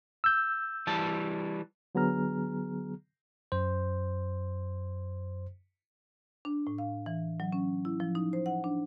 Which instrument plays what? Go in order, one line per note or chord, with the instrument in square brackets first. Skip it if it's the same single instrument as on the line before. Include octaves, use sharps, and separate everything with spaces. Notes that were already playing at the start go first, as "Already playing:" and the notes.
[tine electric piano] E6 G6
[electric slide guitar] E3 G3 A5
[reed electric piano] D3 F#3 B3 G#4 A#5 F6
[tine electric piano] F#2 C5
[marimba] D4
A2
F5
E3
F#3
C#4
E4
F3
D#4
C5
F#5
D4